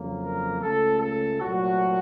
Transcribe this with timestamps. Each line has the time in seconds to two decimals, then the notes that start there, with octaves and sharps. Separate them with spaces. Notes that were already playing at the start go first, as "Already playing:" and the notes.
Already playing: F2 C#3 F#3 A#3
0.22 A#4
0.62 C#2 C#3 A3 A4
1.01 A4
1.40 C2 A#2 F#3 A3 F#4